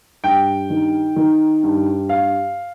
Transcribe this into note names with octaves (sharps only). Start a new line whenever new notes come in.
G2 G5
D#3
D#3
G2
F5